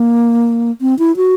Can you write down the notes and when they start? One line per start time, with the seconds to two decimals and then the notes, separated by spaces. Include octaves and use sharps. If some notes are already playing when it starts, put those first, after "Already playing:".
Already playing: A#3
0.81 C4
0.99 E4
1.17 F#4